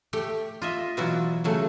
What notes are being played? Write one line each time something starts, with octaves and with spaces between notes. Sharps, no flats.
A3 G4 G5
F4 D#5 E5
B2 E3 F#3 E4 F4
C#3 F#3 A3